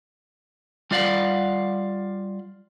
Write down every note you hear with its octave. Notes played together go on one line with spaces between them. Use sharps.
G3 F4 D5 F5 F#5